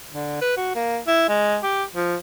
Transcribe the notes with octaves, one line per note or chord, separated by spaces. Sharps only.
D3
B4
F#4
A#3
E4
G#3
G4
F3